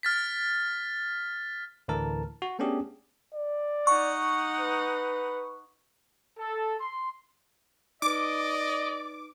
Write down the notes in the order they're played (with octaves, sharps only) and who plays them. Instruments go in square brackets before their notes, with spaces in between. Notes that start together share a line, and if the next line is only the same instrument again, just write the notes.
[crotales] F6 A6 B6
[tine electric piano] D2 A2 D3 E3 A#4 A5
F#4
A3 B3 C#4 D4 G4 G#4
[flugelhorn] D5
[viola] D#4 F#5 [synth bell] C#6
[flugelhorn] B4
[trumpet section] A4
C6
[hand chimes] D#4 B4 [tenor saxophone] D5 [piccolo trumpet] D#5 [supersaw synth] D6